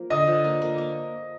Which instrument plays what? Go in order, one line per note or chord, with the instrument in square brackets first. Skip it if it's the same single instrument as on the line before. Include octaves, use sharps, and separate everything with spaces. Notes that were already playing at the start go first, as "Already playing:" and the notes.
Already playing: [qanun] F3 A#3
[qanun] D3 [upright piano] D#5 D#6
[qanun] F3
A#3
A#3
A#3